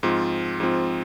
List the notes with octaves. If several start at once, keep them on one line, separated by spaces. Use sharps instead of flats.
G#2 F3 C4 F4
G#2 F3 C4 F4